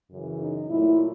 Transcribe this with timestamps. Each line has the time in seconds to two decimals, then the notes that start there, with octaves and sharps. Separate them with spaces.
0.11 F#2 C#3 E3
0.41 D#4
0.69 A#2 F#3 A3 E4